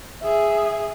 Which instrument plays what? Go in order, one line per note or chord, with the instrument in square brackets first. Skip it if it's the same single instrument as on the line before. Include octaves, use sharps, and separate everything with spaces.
[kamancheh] G#4 E5